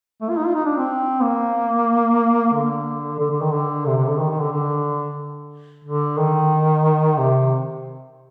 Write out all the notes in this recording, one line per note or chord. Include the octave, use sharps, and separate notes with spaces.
A3
F4
D#4
F4
D#4
D4
C4
A#3
D3
D3
D3
D#3
D3
C3
C3
D3
D#3
D#3
D3
D3
D3
D#3
C3